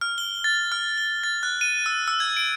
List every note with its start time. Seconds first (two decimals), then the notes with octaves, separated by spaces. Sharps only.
0.01 F6
0.18 G7
0.44 A6
0.72 F6
0.98 G7
1.24 A6
1.43 F#6
1.61 D#7
1.86 E6
2.08 E6
2.20 G#6
2.37 D7